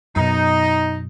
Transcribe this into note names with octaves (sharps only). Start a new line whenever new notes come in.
F#2 B2 D#4